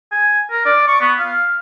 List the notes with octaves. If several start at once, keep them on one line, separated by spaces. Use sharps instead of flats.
G#5
A#4
D5
C#6
B3
F5